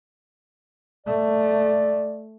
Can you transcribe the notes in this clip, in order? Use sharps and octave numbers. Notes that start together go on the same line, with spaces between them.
A3 D5